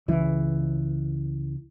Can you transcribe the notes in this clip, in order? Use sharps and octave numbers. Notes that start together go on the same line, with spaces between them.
C#2 E3